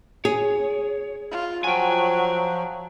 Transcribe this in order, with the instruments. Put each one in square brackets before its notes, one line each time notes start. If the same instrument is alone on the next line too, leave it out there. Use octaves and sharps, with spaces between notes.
[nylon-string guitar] G#4 [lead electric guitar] C#5
[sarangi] F4
[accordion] F3 [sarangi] F#3 [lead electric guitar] G5 G#5